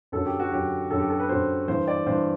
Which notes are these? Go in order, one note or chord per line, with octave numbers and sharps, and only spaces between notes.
F#2 D3 F#3 A4
G4
F#4
F#2 D3 F#3 G4
F#2 D3 F#3 A4
G4
A4
B4
F#2 D3 F#3 C5
G2 E3 C5
D5
G2 E3 C5